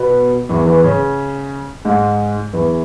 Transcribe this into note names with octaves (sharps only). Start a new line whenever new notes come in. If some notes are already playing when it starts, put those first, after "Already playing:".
Already playing: B2 B3
E2 E3
E2 E3
C#3 C#4
G#2 G#3
E2 E3